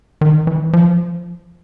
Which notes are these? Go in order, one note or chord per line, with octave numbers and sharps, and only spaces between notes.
D#3
E3
F3